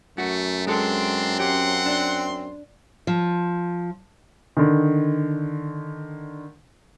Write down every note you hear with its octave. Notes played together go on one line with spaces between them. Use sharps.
F#2 A3 F#4
G#3 C4 D4 A4 C6
C#4 G4 F#5
D4
F3
D3 D#3